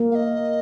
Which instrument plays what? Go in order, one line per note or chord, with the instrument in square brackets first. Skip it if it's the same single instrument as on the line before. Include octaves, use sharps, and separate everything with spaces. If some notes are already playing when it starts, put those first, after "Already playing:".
Already playing: [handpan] A#3
[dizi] F5
D#5